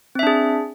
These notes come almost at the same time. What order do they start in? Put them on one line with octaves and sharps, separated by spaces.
C4 E5 D4 G#4